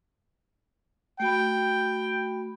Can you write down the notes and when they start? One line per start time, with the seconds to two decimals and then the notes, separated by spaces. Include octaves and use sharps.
1.20 A3 F#4 G5 B5